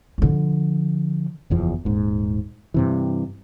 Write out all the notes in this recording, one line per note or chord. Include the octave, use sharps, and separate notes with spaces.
D3 F3
F#1 E2 F3
D#1 G#2
G2 C3 E3